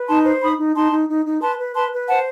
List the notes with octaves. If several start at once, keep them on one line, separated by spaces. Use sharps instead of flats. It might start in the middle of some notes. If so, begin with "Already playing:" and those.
Already playing: B4
D#4 A5 C6
C5
D#4 B5 D#6
D#4
D#4 A5 C6
D#4
D#4
D#4
B4 A5 C6
B4
B4 A5 C6
B4
C5 F#5 A5